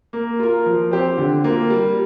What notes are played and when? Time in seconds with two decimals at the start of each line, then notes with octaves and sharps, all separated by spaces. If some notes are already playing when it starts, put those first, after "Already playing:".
0.13 A#3
0.39 F4 A#4
0.66 F3
0.91 C4 G4 C5
1.18 D3
1.44 A#3 F4
1.70 G3